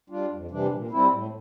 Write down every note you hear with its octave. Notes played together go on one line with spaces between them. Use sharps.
G3 D4 F4
F2
C3 E3 G3 D4
A#2
G3 C4 E4
A2